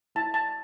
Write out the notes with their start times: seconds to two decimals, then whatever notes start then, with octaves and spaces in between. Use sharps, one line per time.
0.15 A3 E4 A5
0.34 A5